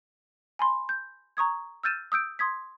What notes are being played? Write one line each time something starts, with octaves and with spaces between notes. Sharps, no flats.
G#5 B5 C6
G6
A#5 C#6 D#6 G#6
E6 F6 G6 A6 D#7 E7
D#6 E6 G6 D7
C6 D#6 G#6 B6